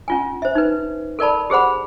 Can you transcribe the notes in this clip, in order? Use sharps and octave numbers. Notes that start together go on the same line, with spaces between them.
C#4 F4 G#5
C5 E5
D#4 B4
A4 A#4 D5 A5 B5
G4 G#4 C5 F#5 B5